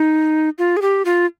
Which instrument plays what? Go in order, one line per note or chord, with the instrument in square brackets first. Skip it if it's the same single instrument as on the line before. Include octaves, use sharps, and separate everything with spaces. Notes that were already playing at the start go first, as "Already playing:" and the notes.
Already playing: [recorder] D#4
F4
G#4
G4
F4